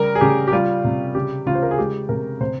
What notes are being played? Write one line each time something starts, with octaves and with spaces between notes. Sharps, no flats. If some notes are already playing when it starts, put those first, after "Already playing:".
Already playing: C#3 G3 A#4
G#4
C#3 G4
G4
G3 F4
C3
C#3 G4
C#3 F4
C5
A#4
G#4
G#3 G4
C3 A#4
C3 C5